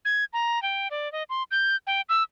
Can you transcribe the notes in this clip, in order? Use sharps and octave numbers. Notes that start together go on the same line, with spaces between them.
G#6
A#5
G5
D5
D#5
C6
G6
G5
E6